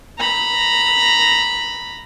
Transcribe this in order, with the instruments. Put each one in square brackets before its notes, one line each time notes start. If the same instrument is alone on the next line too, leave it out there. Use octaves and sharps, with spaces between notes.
[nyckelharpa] A#5 B5